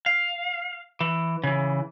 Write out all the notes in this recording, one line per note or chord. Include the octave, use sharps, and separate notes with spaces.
F5
E3
C#3 E3